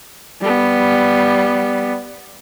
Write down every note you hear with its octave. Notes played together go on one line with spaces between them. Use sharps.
G3 B3